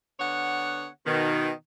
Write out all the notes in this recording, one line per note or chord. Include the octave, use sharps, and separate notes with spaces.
D3 B3 C#5 F#5
B2 D#3